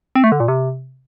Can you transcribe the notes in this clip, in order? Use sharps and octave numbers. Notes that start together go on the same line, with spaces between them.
C4
A3
D3
A#2
C3